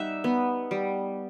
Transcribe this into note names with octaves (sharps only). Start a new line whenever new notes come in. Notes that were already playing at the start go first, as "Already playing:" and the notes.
Already playing: G3 D#4 E5 F#5
B3
G3